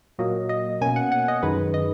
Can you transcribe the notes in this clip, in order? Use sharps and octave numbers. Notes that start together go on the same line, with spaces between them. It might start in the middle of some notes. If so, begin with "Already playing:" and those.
A#2 F#3 A#3 D#5
D#5
B2 A#3 C#4 G#5
F#5
F#5
D#5
F#2 D#3 G#3 B4
D#5